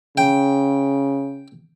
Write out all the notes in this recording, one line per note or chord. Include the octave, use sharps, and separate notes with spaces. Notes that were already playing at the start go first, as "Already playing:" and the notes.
C#3 G5